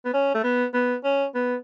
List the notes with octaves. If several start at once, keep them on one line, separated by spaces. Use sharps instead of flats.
B3
C#4
A3
B3
B3
C#4
B3